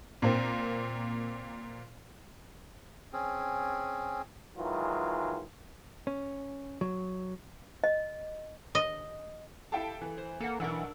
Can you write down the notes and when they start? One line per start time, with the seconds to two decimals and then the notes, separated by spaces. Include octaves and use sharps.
0.22 A#2 A#3 C4
3.13 C4 C#4 G#4
4.57 D#3 E3 F#3 G#3 F4
6.07 C#4
6.81 F#3
7.84 D#5
8.75 D#5
9.72 E4 G4 A4 F5 G5 A5
10.01 E3
10.18 C5
10.40 A#3 A4 F#5
10.60 B1 E3 D4 A#4 F#5 E6